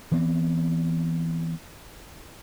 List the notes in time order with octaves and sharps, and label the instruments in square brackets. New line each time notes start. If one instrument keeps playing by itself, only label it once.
[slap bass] E3 B3 C4